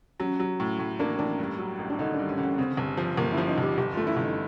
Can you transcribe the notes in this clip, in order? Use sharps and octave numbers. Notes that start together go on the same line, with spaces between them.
F#3 C#4
F#3
A2
A2
A#3 D4
A2 D4
G2
F#3
A1
D4
D3 D#4
D4
G2
C#4
D3
C#4
C#3 C4
G1
F3
G1 A#3
E4
F3
D#4
G1 G4
G1 G4
F4
A3
E4
G1
D#4